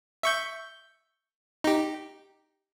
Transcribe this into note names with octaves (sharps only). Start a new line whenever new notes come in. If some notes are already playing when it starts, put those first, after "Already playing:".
E5 C#6 G6
D#4 G4